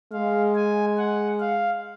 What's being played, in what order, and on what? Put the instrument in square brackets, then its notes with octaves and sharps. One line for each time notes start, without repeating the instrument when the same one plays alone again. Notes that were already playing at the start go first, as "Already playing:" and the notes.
[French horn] G#3 [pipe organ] F5
[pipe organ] G#5
F#5
F5